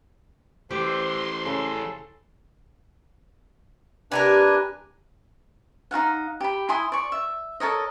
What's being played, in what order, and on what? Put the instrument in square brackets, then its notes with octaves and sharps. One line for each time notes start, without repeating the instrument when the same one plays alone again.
[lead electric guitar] E3 A3 [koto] G4 [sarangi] C5 [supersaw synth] C6
[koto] C#3 [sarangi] A4
[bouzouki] C3 G4 A#4 [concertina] D4 B4 G#5
[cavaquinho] D#4 F#4 F5 F#5
G4 B5
E4 G#5 C6 D#6
D5 C#6
E5
A4 A#4 C#5 D#5